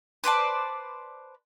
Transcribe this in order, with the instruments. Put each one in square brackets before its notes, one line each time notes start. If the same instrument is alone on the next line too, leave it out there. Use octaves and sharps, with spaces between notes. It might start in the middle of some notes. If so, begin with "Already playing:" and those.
[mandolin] B4 C5 D5 A5